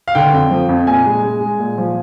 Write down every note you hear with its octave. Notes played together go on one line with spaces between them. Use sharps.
F5
D3 G5
F2
F3
F2
A#2 G#5
G#3
G#3
G#3
A#2
F3